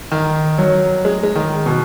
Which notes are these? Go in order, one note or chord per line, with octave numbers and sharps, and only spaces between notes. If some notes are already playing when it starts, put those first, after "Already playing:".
D#3
F#3
G#3
G#3
D#3
B2